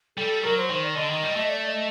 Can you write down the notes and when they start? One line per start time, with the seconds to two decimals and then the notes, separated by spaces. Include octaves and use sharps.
0.17 G3 A4
0.43 F#3 A#4
0.57 C5
0.70 D#3 C5
0.83 D5
0.96 D3 D#5
1.10 D#3
1.23 G3
1.36 A3
1.49 D5
1.66 D#5